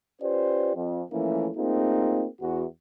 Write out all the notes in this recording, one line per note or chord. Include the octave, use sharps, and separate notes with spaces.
C#4 F4 G4 B4 C5 D5
F2
E3 F3 A3 A#3 C#4 E4
A3 A#3 C4 D#4 F4 G#4
E2 F#4